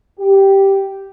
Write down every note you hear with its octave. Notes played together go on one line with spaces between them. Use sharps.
G4